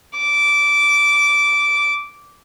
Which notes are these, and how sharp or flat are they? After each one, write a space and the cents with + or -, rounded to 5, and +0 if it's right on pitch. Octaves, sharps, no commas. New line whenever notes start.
D6 -15